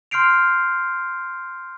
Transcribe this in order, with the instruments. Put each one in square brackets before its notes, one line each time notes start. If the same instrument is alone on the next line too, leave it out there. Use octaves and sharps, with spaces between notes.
[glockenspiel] C6 F6 G6 C7 D7 F7